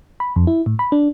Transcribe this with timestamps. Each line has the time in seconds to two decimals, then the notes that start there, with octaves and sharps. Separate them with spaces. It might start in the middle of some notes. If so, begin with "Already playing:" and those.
0.20 B5
0.36 F2
0.47 E4
0.66 A2
0.79 B5
0.92 D4